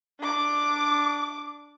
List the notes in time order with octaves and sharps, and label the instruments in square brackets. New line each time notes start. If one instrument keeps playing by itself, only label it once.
[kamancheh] D4 D6